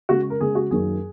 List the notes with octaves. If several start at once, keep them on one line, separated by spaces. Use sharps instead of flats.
C#3 G#3 F#4
A#4
C#3 G#3 G#4
F#4
F#2 D#3 F#3 A#3 G#4